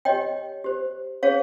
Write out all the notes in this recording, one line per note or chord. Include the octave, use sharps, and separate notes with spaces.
G4 C#5 D#5 G5
G4 C5
C#4 G#4 C5 C#5 F5